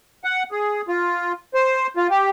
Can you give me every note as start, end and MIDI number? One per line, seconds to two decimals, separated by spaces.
0.24 0.43 78
0.52 0.81 68
0.88 1.32 65
1.54 1.87 72
1.97 2.07 65
2.10 2.30 67